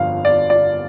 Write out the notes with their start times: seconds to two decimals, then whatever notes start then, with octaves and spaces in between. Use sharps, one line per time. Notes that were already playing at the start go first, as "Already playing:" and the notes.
Already playing: G1 F2 D3 F3 F5
0.25 D5
0.50 D5